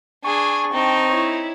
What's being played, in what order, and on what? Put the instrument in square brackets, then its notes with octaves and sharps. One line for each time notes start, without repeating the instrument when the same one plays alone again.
[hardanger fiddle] D4 G#4 [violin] G#5 [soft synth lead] C#6
[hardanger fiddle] C4 D#4 [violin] G5 A5
[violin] E4 C#5